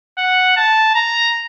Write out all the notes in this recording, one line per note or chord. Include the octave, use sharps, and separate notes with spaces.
F#5
A5
A#5